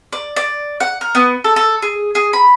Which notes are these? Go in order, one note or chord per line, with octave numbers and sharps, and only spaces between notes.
D5
D5
F#5
A#4
B3
A4
A4
G#4
G#4
B5